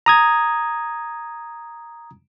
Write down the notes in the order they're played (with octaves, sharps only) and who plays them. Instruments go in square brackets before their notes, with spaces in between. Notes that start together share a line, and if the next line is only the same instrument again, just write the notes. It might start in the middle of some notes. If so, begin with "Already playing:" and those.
[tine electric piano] A#5 D#6 G#6